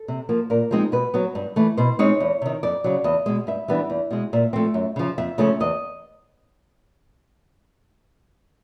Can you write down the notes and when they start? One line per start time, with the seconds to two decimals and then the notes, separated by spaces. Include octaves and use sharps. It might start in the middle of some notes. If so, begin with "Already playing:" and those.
Already playing: A4
0.08 C3
0.29 F3 A#3
0.50 A#2 A#4
0.71 F3 G#3 C4 D#4
0.92 B2 B4
1.14 F#3 B3
1.35 G2
1.56 E3 A3
1.77 B2 C5
1.99 G#3 C4 D#4 C#5
2.20 E2
2.42 C3 D#3
2.63 F2 D5
2.84 C#3 F#3
3.04 E2 D#5
3.26 B2 G#3
3.47 G2 E5
3.68 E3 G3 B3 D4
3.90 E2
4.11 B2 G#3
4.33 A#2 E5
4.53 F3 A3 C4
4.74 F#2
4.96 C#3 F3
5.18 F2 E5
5.38 C#3 F3 A3 C#4
5.60 E2 D#5